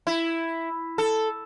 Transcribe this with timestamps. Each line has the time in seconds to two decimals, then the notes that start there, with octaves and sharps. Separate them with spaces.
0.07 E4
0.98 A4